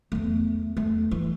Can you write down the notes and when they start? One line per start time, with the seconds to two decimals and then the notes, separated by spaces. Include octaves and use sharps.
0.12 E2 A3
0.77 A3
1.11 E3